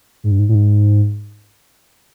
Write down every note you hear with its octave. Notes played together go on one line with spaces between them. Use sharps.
G#2
G2
G#2
A2
G#2